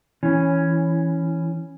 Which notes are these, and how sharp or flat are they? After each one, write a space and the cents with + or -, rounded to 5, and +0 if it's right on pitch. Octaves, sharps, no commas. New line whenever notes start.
E3 +0 C#4 +0